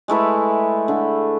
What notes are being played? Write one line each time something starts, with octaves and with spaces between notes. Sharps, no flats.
G#3 A3 E4 B4
D3